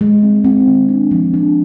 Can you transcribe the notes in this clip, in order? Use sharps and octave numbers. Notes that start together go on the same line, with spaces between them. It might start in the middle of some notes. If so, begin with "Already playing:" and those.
G#3
C4
C4
D#3
D4
F3
D4